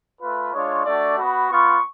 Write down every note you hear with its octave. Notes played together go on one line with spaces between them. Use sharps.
A3 F4 B4
G#3 D4 F4 C#5
A3 D4 F#4 D5
B3 F#4 B5
B3 F4 C#6